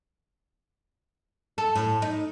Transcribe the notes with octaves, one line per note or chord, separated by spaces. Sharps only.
A4
A2
D#4